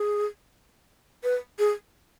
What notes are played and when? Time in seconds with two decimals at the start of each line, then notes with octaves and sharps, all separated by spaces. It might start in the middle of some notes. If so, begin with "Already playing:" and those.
Already playing: G#4
1.24 B4
1.59 G#4